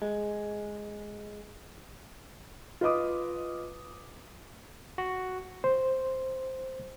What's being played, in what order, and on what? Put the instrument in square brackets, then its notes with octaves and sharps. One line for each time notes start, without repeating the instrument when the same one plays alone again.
[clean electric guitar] G#3
[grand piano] F4 B4 D#5 D6 D#6
[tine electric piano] F#4
[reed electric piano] C5